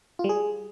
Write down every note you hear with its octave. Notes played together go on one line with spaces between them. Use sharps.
F4
G3
G#4